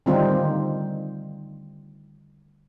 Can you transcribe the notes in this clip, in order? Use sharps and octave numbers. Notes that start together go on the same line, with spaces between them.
D3 D#3 G3 C4 D#4 F4